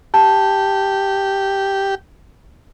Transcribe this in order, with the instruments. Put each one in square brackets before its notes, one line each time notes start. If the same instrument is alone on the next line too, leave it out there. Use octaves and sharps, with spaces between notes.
[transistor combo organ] G4 [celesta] A5